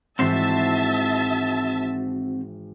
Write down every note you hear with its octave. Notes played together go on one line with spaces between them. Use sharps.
G#1 G#2 E3 C4 F#4 C5 E5 A5